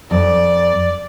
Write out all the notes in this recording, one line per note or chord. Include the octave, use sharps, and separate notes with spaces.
F2 D5